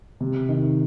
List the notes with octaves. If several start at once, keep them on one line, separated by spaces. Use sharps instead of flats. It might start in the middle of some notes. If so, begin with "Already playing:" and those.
C3
D#3